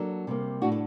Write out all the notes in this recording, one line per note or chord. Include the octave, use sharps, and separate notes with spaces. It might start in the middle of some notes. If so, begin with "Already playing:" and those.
Already playing: F#3 A#3 D4 A4
C3 G3 A#3
A2 A3 D4 F#4
A4